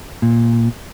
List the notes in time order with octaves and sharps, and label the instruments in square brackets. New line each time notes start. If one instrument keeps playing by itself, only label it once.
[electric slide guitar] A#2